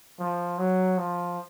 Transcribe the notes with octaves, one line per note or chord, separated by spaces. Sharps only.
F3
F#3
F3